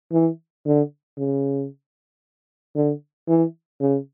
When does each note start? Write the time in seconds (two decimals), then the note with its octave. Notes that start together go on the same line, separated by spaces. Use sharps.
0.12 E3
0.66 D3
1.18 C#3
2.75 D3
3.28 E3
3.80 C#3